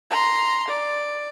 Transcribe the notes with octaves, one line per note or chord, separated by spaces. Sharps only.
A#5 C6
D5